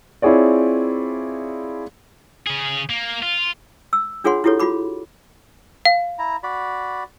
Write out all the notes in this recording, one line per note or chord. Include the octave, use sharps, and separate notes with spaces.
C4 E4 F4 G#4 C#5 D5
C#3 G#4
A#3
F4
E6
D4 F4 G#4 C#5 F#5 C6
E4 F4 G4 A4 C#5
F4 F#4 B5 D6
F5
E4 A#5
F#4 D5 B5